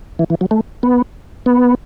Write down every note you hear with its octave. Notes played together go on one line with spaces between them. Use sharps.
E3
E3
F#3
A3
B3
B3